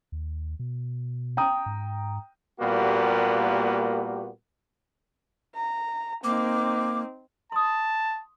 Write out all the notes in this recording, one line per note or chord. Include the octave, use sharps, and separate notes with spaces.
D#2
B2
G5 A#5 D#6
G#2
A#2 G3 A#3 B3 F#4 G4
A#5
A#3 C4 D#4 D6
A5 C6 D#6